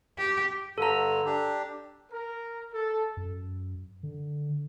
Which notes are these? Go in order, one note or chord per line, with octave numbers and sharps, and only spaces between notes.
G4
G2 D3 A4 A#5
D4 G4
A#4
A4
F#2
D3